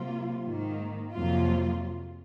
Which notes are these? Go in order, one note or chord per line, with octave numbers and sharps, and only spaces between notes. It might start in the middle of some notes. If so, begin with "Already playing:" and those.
Already playing: C3 F#3 A#3 F4
G#2 D#3 A#3
F2 C3 F#3 A#3 F4